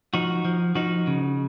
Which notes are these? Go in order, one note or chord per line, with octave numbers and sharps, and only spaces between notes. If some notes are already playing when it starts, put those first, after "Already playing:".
F3 D#4 F#4
F3
F3 D#4 F#4
C#3